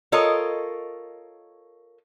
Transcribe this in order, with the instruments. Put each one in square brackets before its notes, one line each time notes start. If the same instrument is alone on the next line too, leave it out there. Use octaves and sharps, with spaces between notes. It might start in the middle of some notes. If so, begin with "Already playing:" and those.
[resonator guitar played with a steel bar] F4 A4 A#4 C#5 D#5